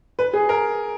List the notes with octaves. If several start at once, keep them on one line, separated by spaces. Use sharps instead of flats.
B4
G#4
A#4